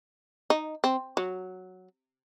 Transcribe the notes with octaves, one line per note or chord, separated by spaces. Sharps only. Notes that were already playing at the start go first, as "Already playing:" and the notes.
D#4
C4
F#3